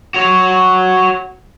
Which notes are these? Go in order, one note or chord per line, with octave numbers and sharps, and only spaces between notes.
F#4 C#5